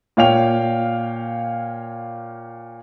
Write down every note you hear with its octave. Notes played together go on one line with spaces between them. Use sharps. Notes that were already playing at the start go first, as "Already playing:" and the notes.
A#2 C#5 F5 G5 F7